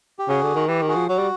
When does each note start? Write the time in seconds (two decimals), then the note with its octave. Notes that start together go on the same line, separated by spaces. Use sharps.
0.19 G4
0.28 C#3 F#4 G#4
0.43 D3
0.55 D#3
0.68 E3 G4
0.82 D#3
0.88 F#4 G#4
0.95 F3
1.08 F#3 F#4
1.18 G3